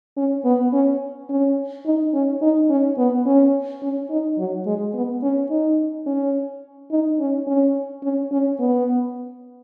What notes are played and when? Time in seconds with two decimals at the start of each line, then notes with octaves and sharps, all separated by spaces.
0.17 C#4
0.45 B3
0.73 C#4
1.30 C#4
1.85 D#4
2.14 C#4
2.42 D#4
2.70 C#4
2.98 B3
3.26 C#4
3.82 C#4
4.10 D#4
4.38 F#3
4.66 G#3
4.94 B3
5.23 C#4
5.50 D#4
6.06 C#4
6.91 D#4
7.19 C#4
7.47 C#4
8.03 C#4
8.31 C#4
8.60 B3